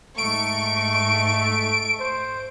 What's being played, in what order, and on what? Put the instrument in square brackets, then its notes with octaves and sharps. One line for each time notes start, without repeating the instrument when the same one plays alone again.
[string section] G#2 C#6 [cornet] A3 [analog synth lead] D7
[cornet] C5